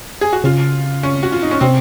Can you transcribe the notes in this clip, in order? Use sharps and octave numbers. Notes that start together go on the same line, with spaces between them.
G#4
F#4
C#3 F4
C#4
F#4
F4
D#4
C#4
C3 C4